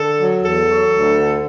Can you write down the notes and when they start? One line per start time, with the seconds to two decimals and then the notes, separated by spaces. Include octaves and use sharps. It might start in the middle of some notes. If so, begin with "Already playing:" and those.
Already playing: D3 A4
0.17 F#3
0.41 E2 A4
0.67 F#3
0.91 D2
1.17 D3